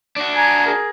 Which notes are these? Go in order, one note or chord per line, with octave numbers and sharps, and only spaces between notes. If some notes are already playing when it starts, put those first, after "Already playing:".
D4 F#4
G#5 A#5 G#6
G#4 A#4